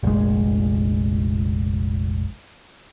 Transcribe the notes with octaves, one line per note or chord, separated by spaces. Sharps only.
F1 A#1 G#3